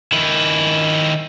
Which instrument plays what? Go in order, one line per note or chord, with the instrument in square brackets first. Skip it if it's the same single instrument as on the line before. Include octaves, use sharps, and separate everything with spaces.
[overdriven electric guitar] D#3 E4